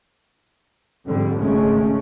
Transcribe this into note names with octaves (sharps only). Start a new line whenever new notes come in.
F2 G#2 D3 G3
G#1 C#3 G#3 A3 C#4